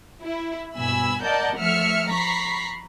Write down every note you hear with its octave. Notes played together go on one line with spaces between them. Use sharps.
E4
G2 B2 G#5 B5 E6
A#4 D5 D#5 F#5 A5 G6
F3 A3 E5 F6 C#7
A#5 B5 C#6 B6 C7